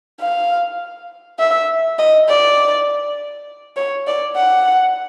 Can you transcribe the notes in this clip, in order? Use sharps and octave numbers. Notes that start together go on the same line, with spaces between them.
F5
E5
D#5
D5
C#5
D5
F#5